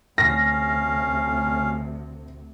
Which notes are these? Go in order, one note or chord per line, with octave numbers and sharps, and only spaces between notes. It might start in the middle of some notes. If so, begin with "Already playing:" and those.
D2 C3 C#4 F5 A#6